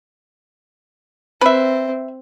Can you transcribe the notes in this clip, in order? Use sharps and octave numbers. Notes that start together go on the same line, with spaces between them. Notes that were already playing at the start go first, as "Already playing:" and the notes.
C4 B4 E5